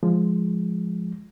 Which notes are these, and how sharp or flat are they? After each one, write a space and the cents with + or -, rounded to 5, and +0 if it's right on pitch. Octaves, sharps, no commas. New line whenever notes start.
F3 +0 G#3 +0